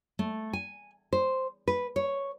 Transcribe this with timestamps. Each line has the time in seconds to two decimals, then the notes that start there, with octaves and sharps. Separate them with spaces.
0.19 A3
0.53 G#5
1.13 C5
1.68 B4
1.96 C#5